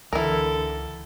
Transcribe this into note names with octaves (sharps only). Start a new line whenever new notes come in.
C#2 D3 E3 E4 A4 A#4